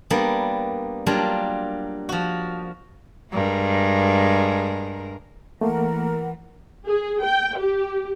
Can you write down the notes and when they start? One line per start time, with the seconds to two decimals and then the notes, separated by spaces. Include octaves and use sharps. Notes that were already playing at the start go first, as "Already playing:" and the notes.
0.10 G3 A#3 B3 D4
1.06 F#3 G3 A#3 D4 F4
2.09 F3 F#4
3.32 G2 G#3 A#4
5.61 E3 A3 A#3 A#4 F#5
6.86 G#4
7.23 G5
7.58 G4